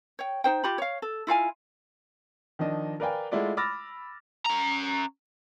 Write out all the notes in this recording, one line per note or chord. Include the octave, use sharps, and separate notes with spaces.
C#5 G5
D#4 C5 G5
F4 G4 B5
C#5 F5
A4
E4 F4 F5 G#5
D#3 F3 D4 D#5
A#4 B4 D5 F5 G5 G#5
G#3 A3 E4 F4 D5 F#5
B5 D6 E6 F6 A6 A#6
C#4 A#5